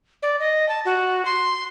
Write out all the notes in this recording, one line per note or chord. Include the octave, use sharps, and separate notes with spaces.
D5
D#5
A5
F#4
C6